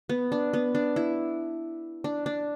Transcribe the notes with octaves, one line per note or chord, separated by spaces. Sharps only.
B3
D4
B3
D4
E4
D4
D4